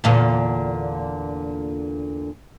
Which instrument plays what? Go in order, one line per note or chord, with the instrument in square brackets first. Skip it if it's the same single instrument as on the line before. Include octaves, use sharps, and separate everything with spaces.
[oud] E2 A#2 D3